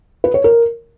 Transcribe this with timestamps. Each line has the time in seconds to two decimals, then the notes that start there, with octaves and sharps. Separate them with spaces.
0.24 B4
0.34 C#5
0.44 A#4